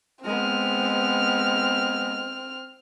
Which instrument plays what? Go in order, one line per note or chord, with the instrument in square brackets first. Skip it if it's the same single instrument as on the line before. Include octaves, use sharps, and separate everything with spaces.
[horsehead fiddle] G#3 B3 [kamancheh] C4 F6